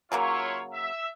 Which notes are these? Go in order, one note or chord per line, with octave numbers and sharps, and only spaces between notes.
C#3 F#3 A#3 E4 F4 C#5
E5